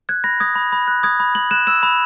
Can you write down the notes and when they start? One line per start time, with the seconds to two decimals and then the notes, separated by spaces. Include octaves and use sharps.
0.09 F#6 G#6
0.24 B5 A#6
0.40 D#6 G#6
0.55 B5
0.72 B5
0.88 F#6
1.03 D#6 G#6
1.20 B5
1.35 B5 F#7
1.51 F#6 E7
1.67 E6 E7
1.83 B5